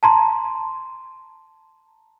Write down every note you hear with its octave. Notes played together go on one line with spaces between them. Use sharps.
A5 A#5 C6